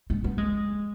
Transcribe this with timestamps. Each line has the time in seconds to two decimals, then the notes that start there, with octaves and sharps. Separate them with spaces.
0.10 G#3
0.24 B3
0.38 G#3